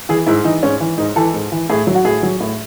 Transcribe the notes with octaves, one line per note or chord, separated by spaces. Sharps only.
E3 G#4
G#2 E4
E3 D#4
G#2 C#4
E3
G#2 D#4
E3 A4
G#2
E3
A2 G#4
F#3
F#4
A2 G#4
F#3
A2